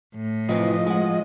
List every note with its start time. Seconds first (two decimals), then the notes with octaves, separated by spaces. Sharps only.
0.15 A2
0.49 C3 E3 F3 C4 D#5
0.86 G#3 F#5